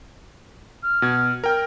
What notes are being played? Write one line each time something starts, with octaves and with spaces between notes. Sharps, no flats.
F6
B2 G#6
A#4 G5 F6